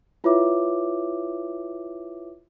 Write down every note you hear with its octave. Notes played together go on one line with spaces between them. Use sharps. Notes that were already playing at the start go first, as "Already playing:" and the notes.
E4 F4 B4 C#5 E5 D6